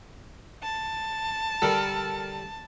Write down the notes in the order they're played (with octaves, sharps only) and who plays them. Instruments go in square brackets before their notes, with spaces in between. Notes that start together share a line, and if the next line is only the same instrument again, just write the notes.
[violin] A5
[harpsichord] D3 G3 [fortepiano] A4 A#4